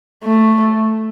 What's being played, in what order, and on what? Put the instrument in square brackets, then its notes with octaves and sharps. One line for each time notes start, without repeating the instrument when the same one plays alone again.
[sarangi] A3